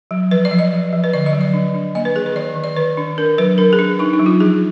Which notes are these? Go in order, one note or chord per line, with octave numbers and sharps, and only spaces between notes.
F#3
F3 B4
D5
F3
D#5
F3
F3
B4
D3 D5
D#5
F#3
D5
D4
D4
A#3 D#5
B4
D#3 G#4
B4
D#3 D5
D#3
D5
D#3 B4
D4
D4 A#4
F#3 B4
D4 A#4
G#4
D4
D4 D#4
D#4
F#3
F4
F3 G#4